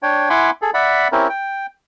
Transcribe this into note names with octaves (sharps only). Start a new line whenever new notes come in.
D4 C#5 G5
E4 F#5 G#5 B5 C6 D6
G#4 A4
D5 E5 F#5 B5
C4 C#4 E4 G4 A#4
G5